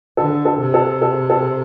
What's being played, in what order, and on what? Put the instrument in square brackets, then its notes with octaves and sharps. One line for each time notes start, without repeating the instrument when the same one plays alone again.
[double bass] D3 [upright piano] A4
[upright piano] A4
[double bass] C3
[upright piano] A4
A4
A4